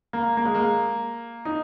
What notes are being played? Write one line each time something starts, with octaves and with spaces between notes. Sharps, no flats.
A#3
A#3
G#3
A#3
D#4